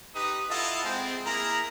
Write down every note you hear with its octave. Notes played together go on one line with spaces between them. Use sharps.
D#4 G4 B4 D#6
E4 F4 A4 D#5 F#5 A5
G#3 C4
A#3 E4 G#4 A#4 A#5